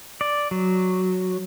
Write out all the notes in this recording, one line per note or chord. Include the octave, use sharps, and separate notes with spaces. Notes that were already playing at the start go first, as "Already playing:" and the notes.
D5
F#3